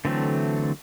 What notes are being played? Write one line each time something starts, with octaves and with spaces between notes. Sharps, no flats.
D3 E3 F#3 A3 C4